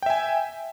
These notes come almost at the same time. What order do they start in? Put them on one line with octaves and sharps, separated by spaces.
G5 E5 G#5